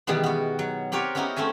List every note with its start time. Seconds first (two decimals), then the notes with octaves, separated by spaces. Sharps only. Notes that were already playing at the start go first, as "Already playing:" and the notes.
0.07 B2 D#3 E3 G3 G#3 B3
0.23 B3 F#4
0.59 F#3
0.92 C4 G4 A#4 B4 C#5 D5
1.15 B3 C#4 D#4 E4 F#4 A#4
1.36 A3 C4 C#4 E5 G#5